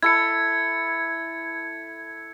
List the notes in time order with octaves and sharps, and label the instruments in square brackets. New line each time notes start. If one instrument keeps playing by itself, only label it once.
[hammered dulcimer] E4 A4 [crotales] G#6 C#7